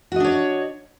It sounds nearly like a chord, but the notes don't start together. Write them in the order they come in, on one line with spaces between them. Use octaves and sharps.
F#4 D#5 D4 C#5